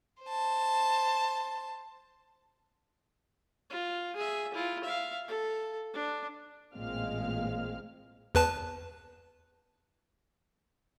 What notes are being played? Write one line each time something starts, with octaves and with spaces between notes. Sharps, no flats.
C5 A5
F4
G#4 E5
E4 F4
E5 F5
A4
D4
A1 A#2 G#3 C4 F5 F6
E2 B4 A5